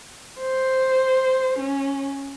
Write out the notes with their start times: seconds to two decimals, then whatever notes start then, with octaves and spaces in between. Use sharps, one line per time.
0.41 C5
1.59 C#4